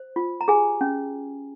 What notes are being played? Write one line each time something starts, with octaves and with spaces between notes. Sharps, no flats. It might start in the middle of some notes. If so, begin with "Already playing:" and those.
Already playing: C5
F4
A#5
G4 G#4 G#5
C#4